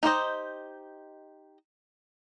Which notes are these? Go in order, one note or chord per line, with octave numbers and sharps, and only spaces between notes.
D#4 G4 C5 D#5